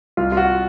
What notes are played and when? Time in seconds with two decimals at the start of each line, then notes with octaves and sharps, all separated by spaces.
0.17 C2 F4
0.32 F4
0.37 F#4